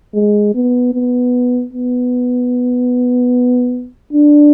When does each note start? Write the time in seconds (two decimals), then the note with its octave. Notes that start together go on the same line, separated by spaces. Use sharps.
0.15 G#3
0.55 B3
0.93 B3
1.73 B3
4.13 D4